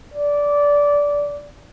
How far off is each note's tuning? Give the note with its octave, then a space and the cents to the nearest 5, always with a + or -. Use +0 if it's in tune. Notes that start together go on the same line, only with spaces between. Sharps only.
D5 -15